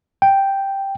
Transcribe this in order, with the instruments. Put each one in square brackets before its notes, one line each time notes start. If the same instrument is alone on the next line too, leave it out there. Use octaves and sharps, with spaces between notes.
[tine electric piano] G5